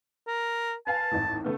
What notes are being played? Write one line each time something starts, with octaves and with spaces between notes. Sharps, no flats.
A#4
B4 F5 G#5 A5
G#1 D#2 A2
C#3 A3 B3